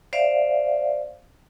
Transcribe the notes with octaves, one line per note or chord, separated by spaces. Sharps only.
C5 D5 E5 F5